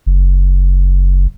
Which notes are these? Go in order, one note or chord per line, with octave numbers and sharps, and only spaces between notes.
F#1